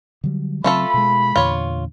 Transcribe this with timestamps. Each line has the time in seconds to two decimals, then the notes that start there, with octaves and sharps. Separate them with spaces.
0.24 D3 F#3 G3
0.64 C#3 F#3 A3 C4 F4 A4 B5
0.94 B2 G#3
1.36 E2 A#2 D3 F4 C#5